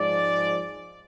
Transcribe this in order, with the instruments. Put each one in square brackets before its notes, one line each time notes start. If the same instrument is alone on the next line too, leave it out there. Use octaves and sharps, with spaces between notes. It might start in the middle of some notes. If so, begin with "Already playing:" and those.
Already playing: [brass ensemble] G#2 F3 G#3 D5